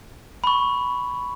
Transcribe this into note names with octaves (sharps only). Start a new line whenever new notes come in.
B5 C#6